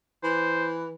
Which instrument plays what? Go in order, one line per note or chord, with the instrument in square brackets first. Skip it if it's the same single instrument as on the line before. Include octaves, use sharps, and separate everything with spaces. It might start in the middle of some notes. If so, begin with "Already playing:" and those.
[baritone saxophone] E3 [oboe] C5